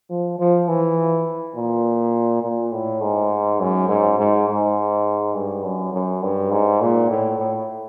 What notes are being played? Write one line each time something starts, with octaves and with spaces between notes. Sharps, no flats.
F3
F3
E3
A#2
A#2
A2
G#2
F#2
G#2
G#2
G#2
G2
F#2
F#2
G2
G#2
A#2
A2
A2